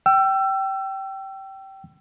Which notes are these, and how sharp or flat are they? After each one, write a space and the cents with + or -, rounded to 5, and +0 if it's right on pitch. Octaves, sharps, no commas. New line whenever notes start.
G5 -20 E6 +30